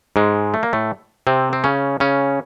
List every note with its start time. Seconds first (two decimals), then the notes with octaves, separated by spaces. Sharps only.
0.16 G#2 G#3
0.54 A3
0.63 A#3
0.73 A2 A3
1.27 C3 C4
1.53 C4
1.64 C#3 C#4
2.00 C#3 C#4